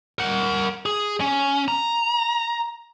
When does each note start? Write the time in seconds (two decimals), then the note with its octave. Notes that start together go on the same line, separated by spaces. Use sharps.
0.19 A#4 F#5
0.85 G#4
1.21 C#4
1.68 A#5